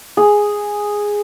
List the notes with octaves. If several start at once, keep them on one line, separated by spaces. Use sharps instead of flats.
G#4